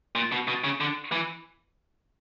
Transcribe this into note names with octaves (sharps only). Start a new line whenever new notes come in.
A#2
B2
B2
C#3
D3
E3